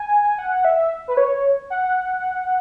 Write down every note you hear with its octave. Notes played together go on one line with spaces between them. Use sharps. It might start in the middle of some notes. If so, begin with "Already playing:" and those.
Already playing: G#5
F#5
E5
B4
C#5
F#5